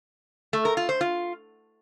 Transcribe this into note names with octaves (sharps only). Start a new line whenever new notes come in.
A3
A#4
F4
C5
F4